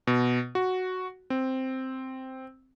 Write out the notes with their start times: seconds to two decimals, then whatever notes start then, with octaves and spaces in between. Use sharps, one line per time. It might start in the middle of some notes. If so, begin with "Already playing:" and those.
0.07 B2
0.55 F#4
1.30 C4